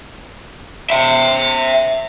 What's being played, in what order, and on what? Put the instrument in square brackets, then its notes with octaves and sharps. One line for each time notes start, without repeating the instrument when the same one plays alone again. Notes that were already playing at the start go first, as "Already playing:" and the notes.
[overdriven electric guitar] E5 G5